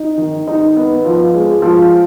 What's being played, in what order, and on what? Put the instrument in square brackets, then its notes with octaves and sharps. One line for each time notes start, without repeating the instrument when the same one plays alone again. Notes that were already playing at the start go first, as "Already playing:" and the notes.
Already playing: [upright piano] D#4
D#3
D#4
B3
F3
G#3
F3